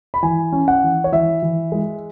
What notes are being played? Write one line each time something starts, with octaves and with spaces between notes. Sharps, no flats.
B5
E3 G#5
C#4
F#5
E3
C#5
E3 E5
E3
G#3